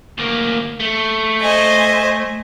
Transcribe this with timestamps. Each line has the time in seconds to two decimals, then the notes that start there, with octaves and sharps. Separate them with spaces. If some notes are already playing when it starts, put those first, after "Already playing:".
0.18 D2 A#3
0.80 A3
1.41 C5 D#5 G#5